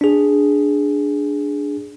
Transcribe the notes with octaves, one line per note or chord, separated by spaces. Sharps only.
D4 G#4